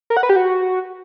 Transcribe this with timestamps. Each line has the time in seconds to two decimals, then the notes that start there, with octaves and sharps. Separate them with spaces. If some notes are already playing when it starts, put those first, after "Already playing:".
0.10 A#4
0.17 F#5
0.23 B4
0.29 G4
0.36 F#4